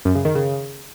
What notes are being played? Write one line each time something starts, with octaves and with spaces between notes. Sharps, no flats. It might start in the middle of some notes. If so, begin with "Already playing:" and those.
F#2
C#3
D#3
C#3